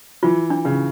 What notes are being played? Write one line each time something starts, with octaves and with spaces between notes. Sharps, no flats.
E3 F4
D4
C#3